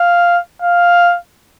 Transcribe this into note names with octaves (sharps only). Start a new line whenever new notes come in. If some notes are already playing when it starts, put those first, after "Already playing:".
Already playing: F5
F5